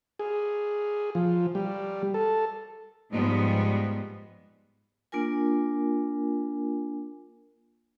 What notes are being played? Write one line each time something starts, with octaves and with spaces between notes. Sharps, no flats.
G#4
F3
G3
A4
G#2 F3 G3 G#3 B3
A#3 D4 F4 A#4 G#5